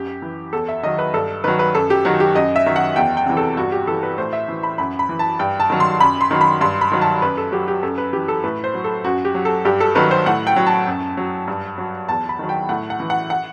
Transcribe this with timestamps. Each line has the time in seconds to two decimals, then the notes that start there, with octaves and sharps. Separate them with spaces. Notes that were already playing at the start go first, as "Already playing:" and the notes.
Already playing: F#2 G4
0.22 E3
0.53 E2 A4
0.68 E5
0.83 D#3 F#3 D#5
0.99 B4
1.14 G2 A4
1.44 D#3 F#3 B4
1.59 B4
1.75 F#2 A4
1.90 G4
2.05 D#3 F#3 F#4
2.20 G4
2.35 F#2 D#5
2.56 E5
2.66 D#3 F#3
2.76 F#5
2.96 E2 G5
3.17 G5
3.26 C3 E3
3.37 A4
3.57 G2 F#4
3.72 G4
3.87 E3 A4
4.03 B4
4.18 A2 C5
4.33 E5
4.49 E3
4.63 B5
4.78 F#2 B5
4.99 B5
5.09 E3
5.19 A5
5.39 G2 G5
5.60 A5
5.70 D#3 F#3
5.80 C6
6.00 F#2 B5
6.21 C6
6.31 D#3 F#3
6.41 B5
6.61 G2 C6
6.81 B5
6.92 D#3 F#3
7.01 A5
7.22 F#2 B4
7.37 A4
7.52 F#3 G4
7.68 G4
7.83 F#2 A4
7.98 B4
8.13 E3 G4
8.28 A4
8.44 A2 B4
8.64 C5
8.74 F#3
8.84 A4
9.04 F#2 F#4
9.25 G4
9.35 F#3
9.45 A4
9.65 G2 G4
9.80 A4
9.95 D#3 F#3 B4
10.11 C5
10.26 A2 F#5
10.47 G5
10.56 F#3
10.67 A5
10.87 F#2
11.17 F#3
11.48 G2
11.78 F#3
12.09 E2 A5
12.29 B5
12.39 D#3 F#3
12.49 G5
12.69 A2 F#5
12.90 F#5
13.00 E3
13.10 F#5
13.30 F#5